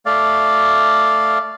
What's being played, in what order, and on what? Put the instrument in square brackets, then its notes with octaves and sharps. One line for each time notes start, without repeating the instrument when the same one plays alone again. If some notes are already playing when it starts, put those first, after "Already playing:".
[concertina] A3 D5 F5